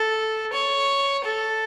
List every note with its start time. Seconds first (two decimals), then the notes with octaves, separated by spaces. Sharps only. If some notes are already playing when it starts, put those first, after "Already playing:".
Already playing: A4
0.52 C#5
1.24 A4